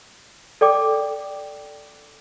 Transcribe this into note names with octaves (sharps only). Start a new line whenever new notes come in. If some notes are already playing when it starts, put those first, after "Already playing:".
A4 D5 G5 D6